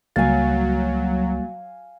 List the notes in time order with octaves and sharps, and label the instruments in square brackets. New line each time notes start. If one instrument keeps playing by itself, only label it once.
[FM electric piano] C#2 [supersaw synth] F#3 [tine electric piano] G3 A#3 A6 [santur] F5 G#5